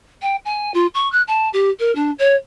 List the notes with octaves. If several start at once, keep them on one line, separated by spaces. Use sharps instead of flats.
G5
G#5
F4
C#6
F#6
A5
G4
A#4
D4
C#5